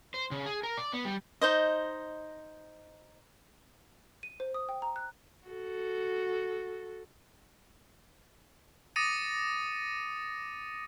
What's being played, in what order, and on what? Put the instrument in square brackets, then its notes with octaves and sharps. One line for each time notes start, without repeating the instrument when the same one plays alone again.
[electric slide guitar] C5
C#3
G#4
A#4
D5
B3
G3
[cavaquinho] D#4 C5 D#5
[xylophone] D#7
C5
D#6
G5
A#5
F#6
[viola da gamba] F#4 A4
[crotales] D6 D#6 A6 A#6 C#7 D#7